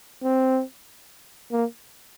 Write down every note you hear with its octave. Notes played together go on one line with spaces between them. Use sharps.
C4
A#3